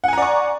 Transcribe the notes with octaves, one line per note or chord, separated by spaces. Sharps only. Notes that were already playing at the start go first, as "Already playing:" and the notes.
D5 F#5 G#5 A#5 C#6